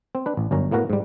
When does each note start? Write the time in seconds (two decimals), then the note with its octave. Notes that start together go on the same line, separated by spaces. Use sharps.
0.15 C4
0.26 D4 B4
0.37 A1
0.51 G1 F#2 C#4 A#5
0.71 A2 A#3 B3 F#4 A#4 A#5
0.90 G#2 G3